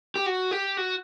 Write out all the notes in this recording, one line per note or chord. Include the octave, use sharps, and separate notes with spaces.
G4
F#4
G4
F#4